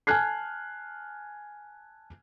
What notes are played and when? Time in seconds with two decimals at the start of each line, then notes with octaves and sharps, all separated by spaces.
0.07 G#5 A5 F6 F#6 G#6 C7